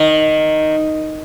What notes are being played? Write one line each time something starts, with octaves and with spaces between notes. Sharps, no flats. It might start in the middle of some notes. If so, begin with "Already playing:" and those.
Already playing: D#3